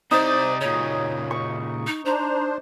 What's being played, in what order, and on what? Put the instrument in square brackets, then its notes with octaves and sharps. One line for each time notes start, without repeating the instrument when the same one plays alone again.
[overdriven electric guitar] C3 D5 [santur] D#4 [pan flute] C5
[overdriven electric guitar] A#2 C#3 [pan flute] C#5
[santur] C#6
[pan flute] D#4
[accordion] D4 C5 [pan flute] A#5